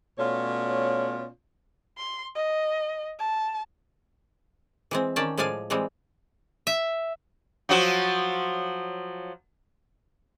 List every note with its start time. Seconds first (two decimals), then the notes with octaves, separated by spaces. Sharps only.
0.18 B2 A3 C#4 F4 C#5 D5
1.97 C6
2.35 D#5
3.19 A5
4.91 E3 G#3 C4
5.16 D#3 C#4 D5 G5 A5
5.38 A2 F3 G#3 D5 F5 G#5
5.70 E3 G3 G#3 C4
6.67 E5
7.69 F3 F#3 F#4